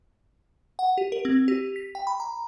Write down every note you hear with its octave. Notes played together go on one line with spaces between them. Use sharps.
F#5
G4
A#4
C4
G4
B6
G5
B5
A#5